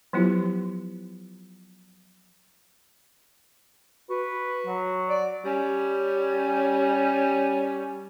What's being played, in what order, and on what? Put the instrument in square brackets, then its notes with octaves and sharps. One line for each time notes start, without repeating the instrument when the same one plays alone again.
[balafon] F3 F#3 B3 E4 F4 G4
[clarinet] F#4 [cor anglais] B4
[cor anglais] F#3
[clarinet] D5
[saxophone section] G3 C#4